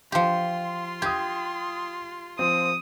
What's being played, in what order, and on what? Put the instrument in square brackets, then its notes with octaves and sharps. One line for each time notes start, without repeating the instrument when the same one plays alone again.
[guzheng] F3 G4 [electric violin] F4 C6
[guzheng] G4 [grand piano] D#6 G#6
[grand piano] F3 C4 [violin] D#6